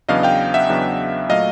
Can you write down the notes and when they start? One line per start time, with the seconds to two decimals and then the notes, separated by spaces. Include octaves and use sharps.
0.09 E2 C#3 F#3 B3 D4 D#5 F5
0.23 F5 G5
0.54 E5 F#5
0.69 E2 C#3 F#3 B3 D4
1.29 A#2 F#3 A3 D#5 F5